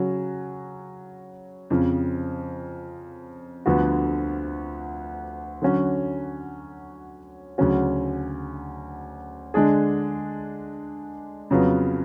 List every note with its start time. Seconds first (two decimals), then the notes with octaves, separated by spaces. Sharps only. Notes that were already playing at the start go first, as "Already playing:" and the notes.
Already playing: C#3 F#3 C#4 F#4
1.70 F2 C#3 F3
3.66 D2 D3 F3 B3 F#4
5.62 D3 F#3 C#4 F#4
7.58 D2 C#3 F#3 C#4 F#4
9.54 D3 G#3 D4 G#4
11.50 F2 C#3 F#3 B3 F4